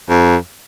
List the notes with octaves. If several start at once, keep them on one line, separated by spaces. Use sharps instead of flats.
F2